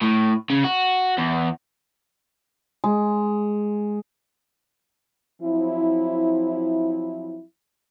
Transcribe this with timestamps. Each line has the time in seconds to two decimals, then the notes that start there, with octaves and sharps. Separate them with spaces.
0.01 A2
0.50 C#3
0.64 F#4
1.18 E2
2.84 G#3
5.42 F3 F#3 C4 E4